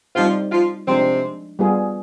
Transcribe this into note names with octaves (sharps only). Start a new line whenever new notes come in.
F3 G3 C4 D#4 F4 G4 C5
F3 F4
C3 F3 G#3 C4 D4
G3 B3 F4 G#4